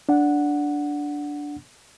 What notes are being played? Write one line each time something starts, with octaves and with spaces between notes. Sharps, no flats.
D4 F#5